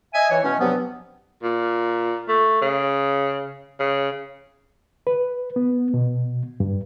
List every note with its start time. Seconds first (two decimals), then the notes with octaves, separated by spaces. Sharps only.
0.14 D#5 E5 G#5
0.31 E3 C#5
0.44 B2 E3 A3 C#4
0.59 G2 C3 F3 F#3 B3
1.43 A#2
2.28 A3
2.62 C#3
3.80 C#3
5.07 B4
5.56 B3
5.94 B2
6.60 G2